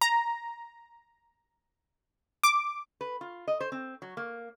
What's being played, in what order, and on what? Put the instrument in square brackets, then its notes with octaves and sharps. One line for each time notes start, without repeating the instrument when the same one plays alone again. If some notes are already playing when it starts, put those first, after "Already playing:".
[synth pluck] A#5
D6
[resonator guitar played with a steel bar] B4
F4
D#5
C5
C4
F#3
A#3